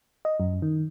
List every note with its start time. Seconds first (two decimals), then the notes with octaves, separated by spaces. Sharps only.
0.25 D#5
0.40 F#2
0.62 D#3